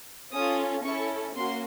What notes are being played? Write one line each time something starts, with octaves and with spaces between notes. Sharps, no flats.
C#4 F4 A4 D#6
C#4 E4 A4 C#6
A#3 C#4 F#4 C6